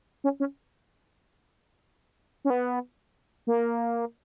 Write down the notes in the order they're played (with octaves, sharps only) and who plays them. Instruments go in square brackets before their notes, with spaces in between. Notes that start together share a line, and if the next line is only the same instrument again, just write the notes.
[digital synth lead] C#4
C#4
C#4
B3
A#3